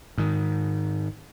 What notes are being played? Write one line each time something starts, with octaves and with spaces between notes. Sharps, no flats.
G#2 D#3